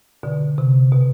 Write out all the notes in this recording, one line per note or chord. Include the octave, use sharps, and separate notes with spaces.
B2 D3
C3
B2